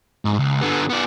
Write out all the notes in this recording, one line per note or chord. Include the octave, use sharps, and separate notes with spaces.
G#2
C#2
D3 B3
B3 D5